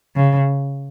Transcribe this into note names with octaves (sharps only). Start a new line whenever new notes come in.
C#3